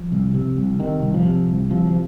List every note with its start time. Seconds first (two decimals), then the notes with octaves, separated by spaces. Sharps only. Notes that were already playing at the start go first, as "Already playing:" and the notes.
Already playing: F3
0.12 C2
0.34 C3
0.57 C2
0.80 C3 D#3
1.02 C2
1.14 F3
1.25 C3
1.48 C2
1.70 C3 F3
1.87 F3